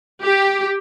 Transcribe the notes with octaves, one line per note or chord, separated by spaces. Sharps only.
G4